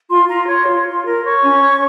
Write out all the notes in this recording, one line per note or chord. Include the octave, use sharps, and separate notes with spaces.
F4 C6
F4 A#5
C#5 C6
F4
F4
A#4
C#5 C#6
C#4
C#5